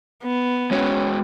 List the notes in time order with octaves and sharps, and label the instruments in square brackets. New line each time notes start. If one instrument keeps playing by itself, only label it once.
[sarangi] B3
[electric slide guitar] G#3 F#4 [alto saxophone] C#4